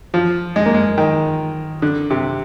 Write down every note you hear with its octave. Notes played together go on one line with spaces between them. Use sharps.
F3
G#3
A#3
G#3
D#3
D3
C3